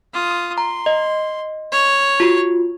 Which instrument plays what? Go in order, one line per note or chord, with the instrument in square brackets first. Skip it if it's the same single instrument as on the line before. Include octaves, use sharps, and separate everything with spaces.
[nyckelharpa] F4 D#6
[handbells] A#5 [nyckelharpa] C6
[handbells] D#5
[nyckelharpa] C#5
[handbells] F4 F#4